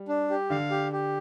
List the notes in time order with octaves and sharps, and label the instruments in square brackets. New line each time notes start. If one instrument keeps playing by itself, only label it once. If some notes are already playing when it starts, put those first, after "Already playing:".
Already playing: [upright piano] G3
[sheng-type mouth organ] D4
G4
[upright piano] D3 [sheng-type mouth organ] F5
[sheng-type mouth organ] G4
G4